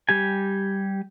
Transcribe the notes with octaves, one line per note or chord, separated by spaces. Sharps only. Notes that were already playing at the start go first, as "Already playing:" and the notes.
G3 G4 G#5